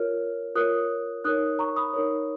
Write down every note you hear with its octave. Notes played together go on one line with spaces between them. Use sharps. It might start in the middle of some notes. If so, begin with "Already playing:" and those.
Already playing: F4 A#4 C#5 F6
F4 A#4 C#5 D#6 F#6
D#4 A#4 C#5 D#6 F#6
A#5 C#6
B5 D#6
D#4 A#4 C#5